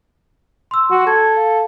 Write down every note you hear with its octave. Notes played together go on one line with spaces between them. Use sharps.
C6 E6
F#4
A4 G#6
F5